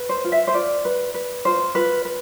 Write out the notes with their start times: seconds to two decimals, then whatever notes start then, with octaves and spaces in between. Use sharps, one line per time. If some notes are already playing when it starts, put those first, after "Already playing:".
Already playing: B4
0.09 C5
0.25 F4
0.32 E5
0.47 C5
0.54 F4 D5
0.85 B4
1.14 B4
1.45 F4 C5
1.75 F4 B4
2.05 B4